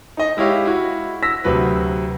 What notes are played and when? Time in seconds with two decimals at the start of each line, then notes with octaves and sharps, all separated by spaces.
0.17 D#4 D#5
0.37 G#3 E4 G4 C#5 F5
0.65 E4 F#4
1.23 E6 A#6 B6
1.44 D2 C3 F#3 B4